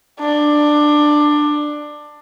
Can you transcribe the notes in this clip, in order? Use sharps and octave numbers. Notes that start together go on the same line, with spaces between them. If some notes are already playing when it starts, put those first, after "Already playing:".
D4